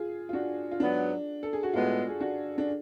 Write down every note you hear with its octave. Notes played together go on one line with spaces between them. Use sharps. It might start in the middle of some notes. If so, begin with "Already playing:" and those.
Already playing: F4 G#4
F4
D4 F#4
F4
G#2 F#3 B3 D4
A4
G#4
F#4
A2 G#3 B3 F4
G#4
D4 F#4
D4